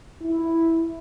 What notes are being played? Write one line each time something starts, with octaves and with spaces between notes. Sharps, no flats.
E4